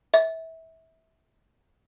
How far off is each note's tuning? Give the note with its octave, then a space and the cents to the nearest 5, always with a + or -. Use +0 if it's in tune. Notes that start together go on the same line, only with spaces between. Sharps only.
E5 -25